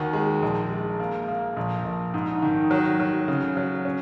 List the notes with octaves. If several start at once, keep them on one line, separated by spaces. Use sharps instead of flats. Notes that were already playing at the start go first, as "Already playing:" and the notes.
Already playing: D#2 F#4
G#3
A#1
G#3
A#3
A#3
A#1
A#1
G#2
D#3
F#3
F#3
C#3
F#3
C#4